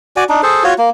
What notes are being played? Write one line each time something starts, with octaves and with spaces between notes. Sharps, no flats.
F#4 D5 G#5
D4 D#4
G#4 A4 C5
F4 F#4 C#5
A#3